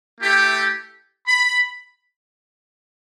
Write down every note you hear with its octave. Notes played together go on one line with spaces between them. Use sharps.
A3 E4 G4
B5